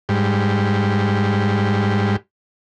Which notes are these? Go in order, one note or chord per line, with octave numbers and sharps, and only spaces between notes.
G#2 G3